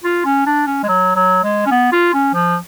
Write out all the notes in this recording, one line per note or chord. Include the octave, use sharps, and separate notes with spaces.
F4
C#4
D4
C#4
G#3
F#3
F#3
G#3
C#4
B3
F4
C#4
F3